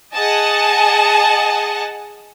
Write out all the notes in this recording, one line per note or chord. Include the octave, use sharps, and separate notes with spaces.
G#4 D#5 F#5 G#5 A5